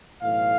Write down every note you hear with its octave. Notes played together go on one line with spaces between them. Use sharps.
B1 A2 E3 A3 F5